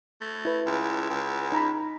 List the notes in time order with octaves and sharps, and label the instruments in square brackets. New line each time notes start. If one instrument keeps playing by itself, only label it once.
[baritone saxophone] A3
[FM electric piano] E4 B4
[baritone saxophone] C#2
C#2
[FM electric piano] D#4 A#5 B5